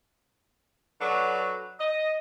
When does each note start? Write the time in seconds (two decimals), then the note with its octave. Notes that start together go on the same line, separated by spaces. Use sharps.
1.00 F#3 D4 F#4 A4 B4
1.80 D#5